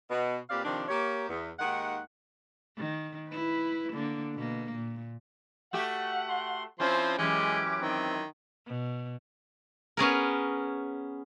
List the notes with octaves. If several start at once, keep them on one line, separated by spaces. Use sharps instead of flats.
B2
A#2 C4 G4 B4 D5 F5
C3 D#3 F3 D4
A#3 G4 C#5
E2
D#2 D#3 G#3 F#5
D#3
E4 B4
D3 A#3
B2 A#3
A#2
A3 F#4 G4 F#5
C6
F3 C4 C#4 E4 C5 C6
F#2 A#2 E3 G#3 C#4 G4 D6
D#3 C4
B2
B3 C#4 G#4 A#4